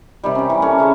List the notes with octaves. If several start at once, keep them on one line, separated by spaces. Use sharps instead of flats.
C3 D#3 G3
C#4 G5
E3 G3
A#3 C#4 A4
C#3 E4 E5 C#6